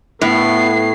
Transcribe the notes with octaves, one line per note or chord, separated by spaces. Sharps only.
A2 B3 C7